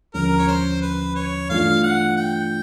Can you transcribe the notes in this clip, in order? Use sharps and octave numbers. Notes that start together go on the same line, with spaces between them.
D#2 D3 F3 G#3 C#4 A#4
C#5
C5
B4
C#5
G2 E3 A3 D4 F4 F5
F#5
G5